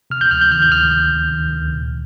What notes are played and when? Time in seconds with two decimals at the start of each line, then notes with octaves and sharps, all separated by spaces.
0.10 C3 F6
0.21 G6
0.31 D2 F6
0.41 G6
0.51 D#3 F6
0.62 G6
0.72 D2 F6
0.91 C3 G6
1.12 D2
1.33 D#3
1.53 D2
1.73 A#2